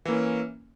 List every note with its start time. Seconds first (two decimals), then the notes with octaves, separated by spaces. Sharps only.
0.05 E3
0.08 A#3
0.11 C#4